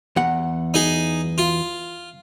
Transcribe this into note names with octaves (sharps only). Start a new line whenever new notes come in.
E2 F#5
D#4 G#4
F4